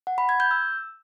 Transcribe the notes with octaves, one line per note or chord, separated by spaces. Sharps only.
F#5
B5
G#6
G6
E6